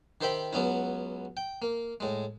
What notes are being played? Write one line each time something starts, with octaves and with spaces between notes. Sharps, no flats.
D#3 G4 C5 E5 G5 B5
C#2 F#3 B3 C#4 E4
G5
A#3
A2 G#3